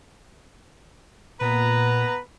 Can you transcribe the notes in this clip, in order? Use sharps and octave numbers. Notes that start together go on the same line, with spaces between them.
A#2 B3 B4 A#5